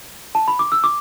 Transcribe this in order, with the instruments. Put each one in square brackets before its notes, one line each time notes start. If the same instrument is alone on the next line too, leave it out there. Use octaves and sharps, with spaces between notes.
[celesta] A5
B5
D6
E6
D6